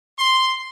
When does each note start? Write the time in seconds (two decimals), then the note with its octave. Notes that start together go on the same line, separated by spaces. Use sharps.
0.19 C6